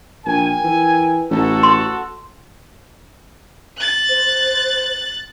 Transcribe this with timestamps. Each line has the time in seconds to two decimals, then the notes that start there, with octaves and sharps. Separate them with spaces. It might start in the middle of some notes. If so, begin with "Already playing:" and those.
0.26 A#1 A#4 G5 G#5
0.64 E3
1.30 A1 F#4 A4
1.63 C6
3.77 F#6 A6
4.09 C5